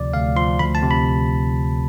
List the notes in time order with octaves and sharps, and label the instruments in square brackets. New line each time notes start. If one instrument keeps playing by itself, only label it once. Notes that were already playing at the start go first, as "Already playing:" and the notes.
Already playing: [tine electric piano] D2 C3 F3 D5
D2 F5
F3 C6
D2 B5
A5
C3
B5